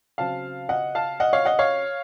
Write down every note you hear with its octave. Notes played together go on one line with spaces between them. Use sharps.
C#3 F#3 C4 F5 A5
D#5 F#5
F5 A5
D#5 F#5
C#5 F5
D#5 F#5
C#5 F5